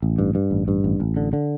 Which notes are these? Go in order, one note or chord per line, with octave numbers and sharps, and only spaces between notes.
A1
G2
G2
A1
G2
A1
A1
D3
D3